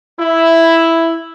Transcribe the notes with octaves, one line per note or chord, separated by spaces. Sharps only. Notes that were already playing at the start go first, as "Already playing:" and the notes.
E4